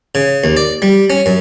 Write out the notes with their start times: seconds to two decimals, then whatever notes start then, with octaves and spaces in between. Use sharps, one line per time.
0.15 C#3
0.44 D#2
0.57 D5
0.82 G3
1.10 C#4
1.26 F#2